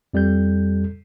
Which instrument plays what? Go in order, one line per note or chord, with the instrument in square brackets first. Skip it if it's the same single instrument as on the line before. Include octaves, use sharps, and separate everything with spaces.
[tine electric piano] F2 G3 A4 G6